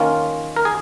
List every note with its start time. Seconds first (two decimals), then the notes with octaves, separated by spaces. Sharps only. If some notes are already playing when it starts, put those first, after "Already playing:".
Already playing: D#3 A#3 C#4 F4
0.56 A#4
0.65 G#4